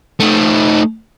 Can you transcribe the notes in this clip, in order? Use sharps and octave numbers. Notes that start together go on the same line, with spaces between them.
A3 D#4